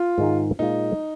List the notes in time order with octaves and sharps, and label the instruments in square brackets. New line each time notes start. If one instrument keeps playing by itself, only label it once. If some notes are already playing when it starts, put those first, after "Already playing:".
Already playing: [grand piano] F4
[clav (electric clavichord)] G#2 D#3 G#3 D#4
[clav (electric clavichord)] A#2 G#3 F4 [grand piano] D#4